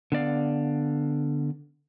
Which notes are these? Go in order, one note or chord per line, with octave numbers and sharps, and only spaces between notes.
D3 B3 D5 F5